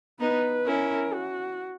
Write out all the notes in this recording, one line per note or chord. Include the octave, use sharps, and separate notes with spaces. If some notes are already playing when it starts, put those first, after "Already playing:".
B3 D#4 B4
C#4 E4 A#4
F#4